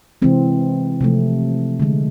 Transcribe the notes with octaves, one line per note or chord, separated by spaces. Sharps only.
C3 E3 G#3 C4
C3 F3 A3
D3 G#3